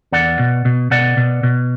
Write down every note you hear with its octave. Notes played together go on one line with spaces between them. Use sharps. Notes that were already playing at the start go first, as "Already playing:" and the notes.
E2 D5 F#5
B2
B2
B2 D5 F#5
B2
B2